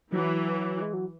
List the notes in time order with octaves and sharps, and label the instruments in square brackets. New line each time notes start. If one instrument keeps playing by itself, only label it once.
[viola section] E3 [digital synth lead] F#3
[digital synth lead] G#3
F#3